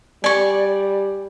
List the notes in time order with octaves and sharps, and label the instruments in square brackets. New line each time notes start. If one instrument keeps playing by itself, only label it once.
[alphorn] G3 [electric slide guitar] D5 [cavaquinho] G#5 C#6